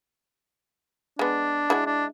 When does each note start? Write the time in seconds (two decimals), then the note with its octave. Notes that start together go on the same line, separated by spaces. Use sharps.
1.19 G#3 B3 D4
1.70 G#3 E4 F#4
1.86 D4